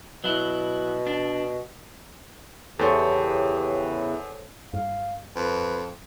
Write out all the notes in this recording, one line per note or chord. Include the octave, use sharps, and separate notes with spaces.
B2 F#3 E4
D4
E2 C#3 E3 B3 G4 A4 C5 C#5
G2 F5
F2 B4